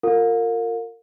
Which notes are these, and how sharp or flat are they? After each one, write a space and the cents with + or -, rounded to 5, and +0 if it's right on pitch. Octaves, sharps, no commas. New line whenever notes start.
F4 +5 A#4 -30 F5 +40